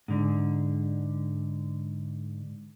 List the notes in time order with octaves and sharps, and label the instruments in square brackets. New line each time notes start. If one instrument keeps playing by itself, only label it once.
[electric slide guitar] G#2 D3